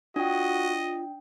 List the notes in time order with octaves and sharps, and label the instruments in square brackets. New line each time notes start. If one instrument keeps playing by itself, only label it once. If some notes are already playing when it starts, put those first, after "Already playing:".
[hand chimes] D4 G5 [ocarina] F4 [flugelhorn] F#4 [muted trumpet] D#5